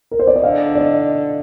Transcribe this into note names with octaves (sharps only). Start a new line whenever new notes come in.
A#4
C5
D5
D#5
D3 F5
D5
D#5